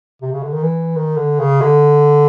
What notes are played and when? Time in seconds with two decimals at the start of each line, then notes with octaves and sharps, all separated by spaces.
0.22 C3
0.33 C#3
0.43 D3
0.53 D#3
0.63 E3
0.96 D#3
1.18 D3
1.40 C#3
1.62 D3